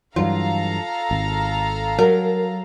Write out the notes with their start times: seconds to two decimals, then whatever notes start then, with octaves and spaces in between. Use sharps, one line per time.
0.16 G2 E3 F#3 F4 A4 F5 A#5
1.11 G#1
1.99 F#3 A#4